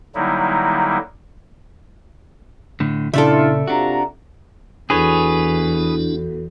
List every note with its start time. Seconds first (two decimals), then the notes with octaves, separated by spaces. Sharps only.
0.15 D3 F#3 G3 A#3 D#4 E4
2.80 A2 D3
3.14 A#2 C#3 D4 E4 F4 A4 D5 E5
3.68 C3 D4 F4 F#4 A#5
4.90 E2 D4 E4 F#4 G#4 A4 B4 C#5